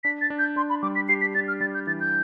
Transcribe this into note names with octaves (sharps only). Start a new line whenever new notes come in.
D4 B6
A6
D4
G6
D4 C6
B5
G3 D6
B6
G4 C7
B6
D4 A6
F6
G3 A6
G6
E3 A6
G6